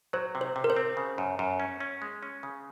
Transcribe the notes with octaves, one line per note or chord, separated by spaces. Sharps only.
F#3 C5
C3
C5
C3
A#4
C5
C4
C#3
F#2
F#2
C#4
C#4
G#3
C#4
C#3